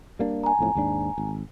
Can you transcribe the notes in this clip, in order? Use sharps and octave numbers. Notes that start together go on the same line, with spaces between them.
G3 A#3 D4
G#5 A#5
B1 F2 A2
D#2 G#2 D4
G#1